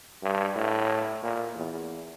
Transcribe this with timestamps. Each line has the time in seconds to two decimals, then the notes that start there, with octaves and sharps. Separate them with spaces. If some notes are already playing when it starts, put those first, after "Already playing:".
0.23 G2
0.55 A2
1.23 A#2
1.55 E2